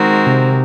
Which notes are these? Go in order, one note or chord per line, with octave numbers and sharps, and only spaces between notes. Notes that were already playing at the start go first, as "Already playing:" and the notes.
Already playing: D#3 G#3 C4 F#4 A#4
C3